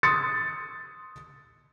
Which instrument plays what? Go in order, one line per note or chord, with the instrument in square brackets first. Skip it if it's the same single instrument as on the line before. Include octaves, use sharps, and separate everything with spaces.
[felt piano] C6 D#6 A6 C#7